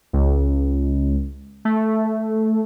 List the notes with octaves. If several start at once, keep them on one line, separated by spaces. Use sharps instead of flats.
C#2
A3